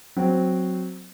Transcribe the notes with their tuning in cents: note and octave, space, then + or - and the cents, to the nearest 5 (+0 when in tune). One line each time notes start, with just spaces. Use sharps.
F#3 -5 C4 -5